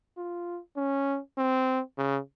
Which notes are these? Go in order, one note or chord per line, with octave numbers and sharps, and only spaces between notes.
F4
C#4
C4
C#3